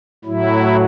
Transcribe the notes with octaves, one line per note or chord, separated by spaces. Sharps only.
A2 F#3 E4